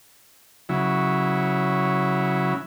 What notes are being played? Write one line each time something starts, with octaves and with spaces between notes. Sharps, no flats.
C#3 F#3 E4